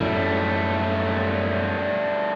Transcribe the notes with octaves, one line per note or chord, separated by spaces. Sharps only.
F#2 A2 G3 A3